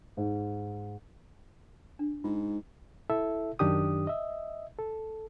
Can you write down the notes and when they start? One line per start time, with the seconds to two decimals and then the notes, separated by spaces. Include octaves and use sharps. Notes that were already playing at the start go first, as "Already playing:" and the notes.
0.17 G#2
1.99 D4
2.24 G#2 F4
3.10 E4 A4 E5
3.59 F#2 D#3 D4 G4 D#6
4.07 D#5 E5
4.79 A4